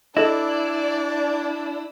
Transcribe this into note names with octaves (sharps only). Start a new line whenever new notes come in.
D4 E4 A4 D5 D#5